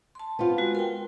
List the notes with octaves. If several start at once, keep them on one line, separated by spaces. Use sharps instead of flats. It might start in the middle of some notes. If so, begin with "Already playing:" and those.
A5 C6
B3 C4 F4
G#3 F#4
A#4 G5